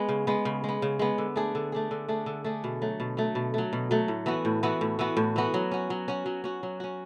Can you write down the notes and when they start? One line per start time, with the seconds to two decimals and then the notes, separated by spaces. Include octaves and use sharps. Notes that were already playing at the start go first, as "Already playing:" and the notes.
Already playing: G#3 B3
0.09 C#3
0.27 G#3 B3
0.45 C#3
0.64 G#3 B3
0.82 C#3
0.99 G#3 B3
1.18 D3
1.36 A3 D4 G#4
1.55 D3
1.72 A3 D4 G#4
1.91 D3
2.09 A3 D4 G#4
2.26 D3
2.44 A3 D4 G#4
2.64 B2
2.82 F#3 A3
3.00 B2
3.17 F#3 A3
3.35 B2
3.54 F#3 A3
3.73 B2
3.91 F#3 A3
4.08 A2
4.26 E3 B3 F#4
4.45 A2
4.63 E3 B3 F#4
4.81 A2
4.99 E3 B3 F#4
5.17 A2
5.36 E3 B3 F#4
5.54 F#3
5.72 C#4 F#4
5.90 F#3
6.08 C#4 F#4
6.26 F#3
6.44 C#4 F#4
6.63 F#3
6.80 C#4 F#4